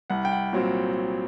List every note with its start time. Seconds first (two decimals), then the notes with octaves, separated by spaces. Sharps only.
0.10 C2 F#5
0.25 G5
0.32 F#5
0.53 A#2 F#3 C4